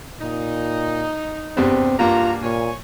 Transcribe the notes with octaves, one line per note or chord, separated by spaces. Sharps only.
A#2 D#4
E2 G2 C3 C4
G2 A#3 F4 F#4 A#5
A#2 C#5 G#5